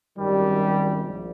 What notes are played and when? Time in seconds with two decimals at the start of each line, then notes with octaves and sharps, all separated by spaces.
0.17 G#1 F#2 D#3 G3
1.03 A#1 A#2